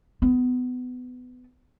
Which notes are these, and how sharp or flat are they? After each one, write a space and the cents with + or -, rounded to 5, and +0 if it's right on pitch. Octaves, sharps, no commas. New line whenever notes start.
B3 +20